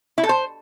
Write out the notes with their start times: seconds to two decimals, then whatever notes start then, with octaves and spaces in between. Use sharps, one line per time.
0.18 E4
0.23 A4
0.29 C5